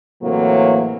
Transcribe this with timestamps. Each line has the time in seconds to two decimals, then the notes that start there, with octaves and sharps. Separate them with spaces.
0.22 A2 C3 E3 F#3 A#3